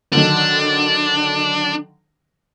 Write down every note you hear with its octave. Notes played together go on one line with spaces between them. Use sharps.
D3 D#3 F#3 D4